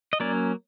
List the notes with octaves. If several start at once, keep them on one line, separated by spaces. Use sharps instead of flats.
D#5
F#3 A#3 C#4 D5